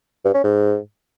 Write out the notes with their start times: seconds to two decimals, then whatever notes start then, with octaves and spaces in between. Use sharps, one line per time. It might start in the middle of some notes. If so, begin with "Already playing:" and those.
0.25 G2
0.34 C#4
0.44 G#2